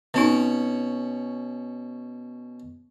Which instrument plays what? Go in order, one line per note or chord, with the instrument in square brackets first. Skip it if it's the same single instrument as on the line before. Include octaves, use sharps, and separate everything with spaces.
[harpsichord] B2 C#4 [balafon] C4 D#4